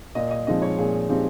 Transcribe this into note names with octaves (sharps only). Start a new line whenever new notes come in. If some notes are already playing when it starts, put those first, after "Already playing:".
A#2 D#5
D#5
F3 G#3 C4 D#4 D#5
C#5
A#2 G#4
F3 G#3 C4 D#4 G4